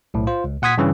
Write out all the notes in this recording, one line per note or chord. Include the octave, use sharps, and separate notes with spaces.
B1 A2
F4 C5
C#2
A#2 F#5 C6 D#6 G#6 B6
G2 C#3 E3 C#4